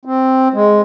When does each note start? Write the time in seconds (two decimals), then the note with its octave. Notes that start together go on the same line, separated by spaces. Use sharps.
0.05 C4
0.54 G#3